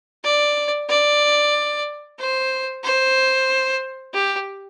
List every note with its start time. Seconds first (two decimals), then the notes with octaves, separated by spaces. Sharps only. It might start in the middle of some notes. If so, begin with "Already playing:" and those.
0.24 D5
0.89 D5
2.19 C5
2.84 C5
4.14 G4